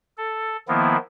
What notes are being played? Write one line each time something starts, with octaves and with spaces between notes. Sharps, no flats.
A4
D#3 F3 A#3 B3 E4